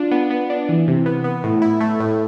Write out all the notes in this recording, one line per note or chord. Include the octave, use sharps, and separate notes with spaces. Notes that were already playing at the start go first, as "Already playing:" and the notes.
Already playing: D4 F4
B3
B3
D4
E3
C3
B3
B3
A2
E4
A3
A2